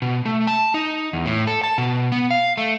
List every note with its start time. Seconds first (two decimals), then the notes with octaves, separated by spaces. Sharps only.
0.02 B2
0.25 A3
0.47 A5
0.74 D#4
1.13 E2
1.26 A2
1.47 A4
1.64 A5
1.78 B2
2.12 B3
2.31 F5
2.57 A3